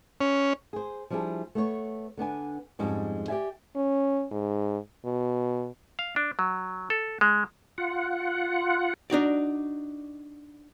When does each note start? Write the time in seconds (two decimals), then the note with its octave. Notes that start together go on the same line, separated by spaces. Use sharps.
0.21 C#4
0.73 G#4 C5
1.10 F3 G3 D4 E4 G#4
1.55 A3 B3 C#5
2.17 D3 B3 D4 G#5
2.79 F2 G#2 G3 G#3 C#4
3.28 G4 A4 D5 E5 G#5
3.76 C#4
4.31 G#2
5.05 B2
5.99 F5
6.16 D4
6.39 F#3
6.90 A4
7.21 G#3
7.78 F4 F#5
9.10 D4 D#4 F#4 D5